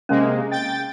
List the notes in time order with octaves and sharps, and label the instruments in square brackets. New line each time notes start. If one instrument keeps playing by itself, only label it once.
[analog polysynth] C3 G#3 A#3 [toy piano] C#4
[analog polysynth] G5 A6